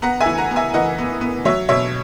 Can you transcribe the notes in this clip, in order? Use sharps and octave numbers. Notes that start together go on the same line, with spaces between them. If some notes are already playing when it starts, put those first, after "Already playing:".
B3 F#5 A#5
E5 G#5
E3
F#5 A#5
B3
E5 G#5
E3 D#5 F#5
B3
B3
F#3 C#5 E5
B2 C#5 E5